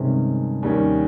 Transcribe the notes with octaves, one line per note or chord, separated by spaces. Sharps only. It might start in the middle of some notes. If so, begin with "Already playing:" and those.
Already playing: G2 C3 D#3 G#3 C#4
D#2 D#3 G3 C#4